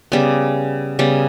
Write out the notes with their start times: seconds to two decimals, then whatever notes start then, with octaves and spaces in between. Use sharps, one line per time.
0.12 C#3 G3 B3
0.99 C#3 G3 B3